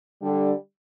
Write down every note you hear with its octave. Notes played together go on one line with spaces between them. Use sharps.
D3 G3